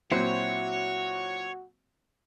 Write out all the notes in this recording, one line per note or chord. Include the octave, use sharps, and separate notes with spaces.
A#2 F#3 C4 E4 F#4 C5 C#5